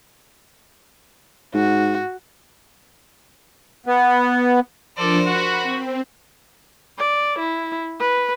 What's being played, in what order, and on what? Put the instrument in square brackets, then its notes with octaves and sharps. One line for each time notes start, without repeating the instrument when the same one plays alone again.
[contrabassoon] G#2 [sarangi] F#4
[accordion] B3
[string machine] F3 D4 [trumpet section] A4 D5 [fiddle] A#4 C5
[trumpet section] F#4 [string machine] B5
[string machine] C4
[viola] D5
E4
B4